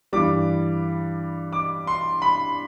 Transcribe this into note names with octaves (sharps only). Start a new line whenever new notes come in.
G2 E3 G3 D6
D6
C6
B5